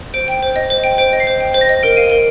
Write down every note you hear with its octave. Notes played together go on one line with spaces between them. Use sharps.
C5 D7
G5
C5
D#5
C5
G5
C5 D7
D#5
C7
C5
G5
C5
A#6
D#5
A#4 D7
F5 D#7
A#4 D7